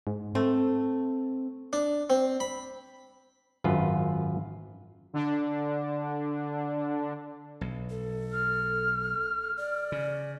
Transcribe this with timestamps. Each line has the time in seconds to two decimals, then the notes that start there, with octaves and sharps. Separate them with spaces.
0.07 G#2
0.35 A3 C4
1.73 D4
2.10 C4
2.40 B5
3.64 G#1 F#2 F4 B4
5.14 D3 D4
7.61 B1
7.90 A4
8.33 F6
9.57 D5
9.92 C#3